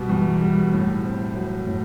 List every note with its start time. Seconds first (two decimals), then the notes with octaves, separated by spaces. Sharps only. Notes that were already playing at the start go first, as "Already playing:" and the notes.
Already playing: B2 G3
0.09 E2
0.41 G3
0.72 A2
1.03 C4
1.35 F#3
1.67 A2